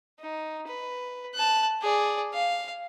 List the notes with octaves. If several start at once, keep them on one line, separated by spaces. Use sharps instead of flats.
D#4
B4
A5 F#6
G#4 D5
F5